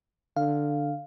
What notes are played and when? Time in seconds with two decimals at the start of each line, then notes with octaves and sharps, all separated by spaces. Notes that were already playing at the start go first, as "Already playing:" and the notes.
0.37 D3 F5